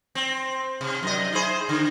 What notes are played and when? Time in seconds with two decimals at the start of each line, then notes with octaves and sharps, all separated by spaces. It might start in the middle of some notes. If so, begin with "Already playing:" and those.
0.15 C4
0.81 C3
1.03 F#2 D#5
1.33 E4 G#4 C5
1.69 D3